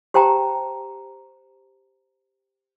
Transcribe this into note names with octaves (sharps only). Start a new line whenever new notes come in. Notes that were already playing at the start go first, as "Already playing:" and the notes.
G4 C5 G5 A5 A#5